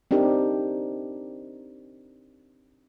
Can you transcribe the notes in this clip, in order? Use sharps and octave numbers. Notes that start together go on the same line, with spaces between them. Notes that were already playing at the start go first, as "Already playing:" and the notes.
C4 D4 D#4 G4 A#4